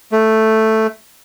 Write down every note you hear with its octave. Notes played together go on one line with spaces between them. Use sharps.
A3